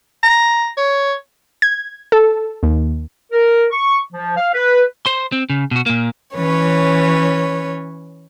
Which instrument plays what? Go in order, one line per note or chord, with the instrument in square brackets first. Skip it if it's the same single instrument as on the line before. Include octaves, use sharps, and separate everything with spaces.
[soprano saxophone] A#5
C#5
[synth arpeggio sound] G#6
A4
D#2
[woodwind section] A#4
C#6
F3
F5
B4
[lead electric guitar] C5 C6
C4
C#3
B2 F#4
A#2 A#3
[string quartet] E3 C#4 B4 C#5